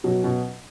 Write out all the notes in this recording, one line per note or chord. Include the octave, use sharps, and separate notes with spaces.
B2 F#3
B2